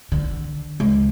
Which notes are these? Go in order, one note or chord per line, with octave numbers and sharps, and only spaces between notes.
D3
C#2